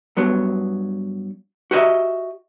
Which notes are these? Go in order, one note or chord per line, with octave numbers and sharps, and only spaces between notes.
G2 F#3 B3
F#4 G4 B4 D#5 E5